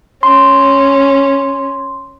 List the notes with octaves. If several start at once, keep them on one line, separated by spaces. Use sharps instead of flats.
C#4 C6